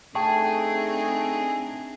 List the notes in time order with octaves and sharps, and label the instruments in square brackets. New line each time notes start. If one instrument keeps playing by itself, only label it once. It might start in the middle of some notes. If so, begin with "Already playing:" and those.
[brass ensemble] A3 [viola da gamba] C4 D4 D#4 [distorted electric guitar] G#4 [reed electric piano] G5 A5 C#6